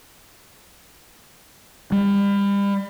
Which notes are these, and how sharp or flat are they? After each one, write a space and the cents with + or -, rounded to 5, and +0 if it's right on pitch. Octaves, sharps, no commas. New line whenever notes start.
G3 +35